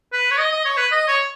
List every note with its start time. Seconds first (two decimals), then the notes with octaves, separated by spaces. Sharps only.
0.13 B4
0.31 C#5
0.38 D#5
0.52 D#5
0.65 C#5
0.77 B4
0.92 D#5
1.08 C#5